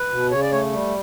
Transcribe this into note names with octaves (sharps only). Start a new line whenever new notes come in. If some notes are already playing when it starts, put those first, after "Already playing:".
Already playing: B4
B2
C#3 C#5
D5
A3 C#5
G3